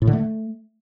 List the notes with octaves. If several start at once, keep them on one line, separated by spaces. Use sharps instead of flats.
A2
D3
A3